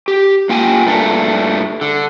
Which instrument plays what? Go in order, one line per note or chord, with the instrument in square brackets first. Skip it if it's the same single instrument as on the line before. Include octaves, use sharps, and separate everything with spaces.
[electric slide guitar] G4
A#3 F4 G5 G#5
G2 A#2 A3 D4
D3